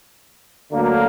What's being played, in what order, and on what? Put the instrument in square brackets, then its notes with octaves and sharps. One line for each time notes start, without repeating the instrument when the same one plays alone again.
[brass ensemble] D2 D3 F#3 A#3